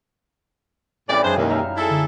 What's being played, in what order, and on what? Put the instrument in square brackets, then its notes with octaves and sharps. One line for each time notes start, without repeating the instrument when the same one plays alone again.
[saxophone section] A2 D5 [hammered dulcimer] C#3 E3 G3 [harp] C4 C#4 D#6
[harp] F#2 G#3 [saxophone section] D4 G#4 C5
[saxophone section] D#2 [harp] B2 E4
[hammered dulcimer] D#4 E5 F5 [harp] A#5
[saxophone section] E4 G#4 A4
[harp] D3 E6